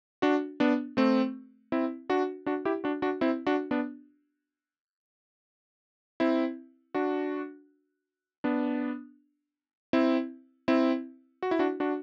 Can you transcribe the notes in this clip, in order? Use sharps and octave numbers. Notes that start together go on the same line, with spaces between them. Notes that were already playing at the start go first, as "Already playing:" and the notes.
D4 F#4
B3 D4
A3 C4
C4 E4
D4 F#4
D4 F#4
E4 G4
D4 F#4
D4 F#4
C4 E4
D4 F#4
B3 D4
C4 E4
D4 F#4
B3 D4
C4 E4
C4 E4
F#4
E4
D4 F#4
D4 F#4